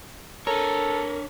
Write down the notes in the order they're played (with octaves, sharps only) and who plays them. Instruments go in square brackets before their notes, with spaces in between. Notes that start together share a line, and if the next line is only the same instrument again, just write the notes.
[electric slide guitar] D4 C#5 [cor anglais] A4 [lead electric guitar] A#4